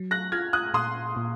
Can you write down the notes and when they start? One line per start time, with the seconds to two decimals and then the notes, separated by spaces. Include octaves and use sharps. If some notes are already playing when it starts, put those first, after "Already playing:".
Already playing: F#3
0.11 F#6 A#6
0.32 F4 F6 G#6
0.53 D#6 F#6
0.74 A#2 C6 D#6
1.16 A#2